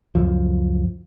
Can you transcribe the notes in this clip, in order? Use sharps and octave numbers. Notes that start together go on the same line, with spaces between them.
C#2 F#2 F3